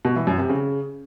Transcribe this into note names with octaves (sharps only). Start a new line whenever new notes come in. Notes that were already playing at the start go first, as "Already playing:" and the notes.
B2
E3
F#2
C3
C#3